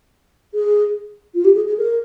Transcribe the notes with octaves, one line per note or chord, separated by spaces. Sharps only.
G#4
F4
G4
G#4
G#4
A#4